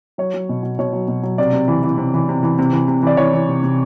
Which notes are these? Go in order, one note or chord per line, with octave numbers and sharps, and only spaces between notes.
F#3 C#5
F#3
B2
B2
B2 C#5
F#3
B2
F#3
C3 D5
C3
E3
E3
C3
E3
C3
E3
C3
E3
C3
E3 D5
E3 C#5
E3
C3
C3